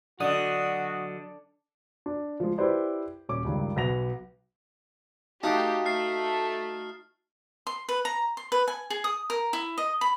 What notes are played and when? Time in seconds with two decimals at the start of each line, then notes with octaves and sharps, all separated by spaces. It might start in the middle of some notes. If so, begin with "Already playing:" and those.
0.20 D3 F#3 F#4 D5 D#5 F#5 D#6
2.06 D4
2.40 F3 G#3
2.58 E4 G4 B4 C5 D5
3.29 D#1 C#4 D6
3.45 C#2 G2 D#3
3.76 B1 B3 A#6 F7
5.43 A3 D#4 F#4 G4 F5 A5
5.86 A3 F6 C7
7.67 C6
7.89 B4
8.05 A#5
8.37 C6
8.52 B4
8.68 G#5
8.90 G#4
9.04 D#6
9.30 A#4
9.53 E4
9.78 D#5
10.01 B5